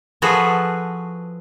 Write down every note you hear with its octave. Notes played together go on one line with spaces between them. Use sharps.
F3 F4 F#4 G#4 A4 B4